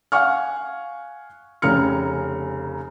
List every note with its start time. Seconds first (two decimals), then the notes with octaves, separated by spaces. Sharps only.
0.12 F5 F#5 G#5 C#6 F6
1.62 F1 C#3 A#5 F6 C#7